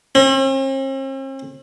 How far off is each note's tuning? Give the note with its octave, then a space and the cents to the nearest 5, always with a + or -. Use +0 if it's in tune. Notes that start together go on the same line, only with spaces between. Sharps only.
C4 +45